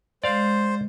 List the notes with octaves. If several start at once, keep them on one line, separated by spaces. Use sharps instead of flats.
G#3 C5 D5 F5